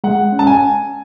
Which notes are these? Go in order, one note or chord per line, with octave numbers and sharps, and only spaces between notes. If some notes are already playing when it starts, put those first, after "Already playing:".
G#3 F#5
C#4
A5
G#5